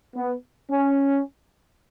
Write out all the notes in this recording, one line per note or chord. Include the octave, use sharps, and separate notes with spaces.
B3
C#4